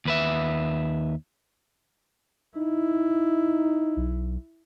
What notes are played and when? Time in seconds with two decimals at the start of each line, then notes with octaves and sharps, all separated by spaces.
0.05 D#2 B4 E5
2.57 D#4 E4
3.96 B1